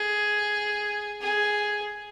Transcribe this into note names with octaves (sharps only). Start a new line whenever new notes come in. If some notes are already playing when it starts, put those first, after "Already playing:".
Already playing: G#4
G#4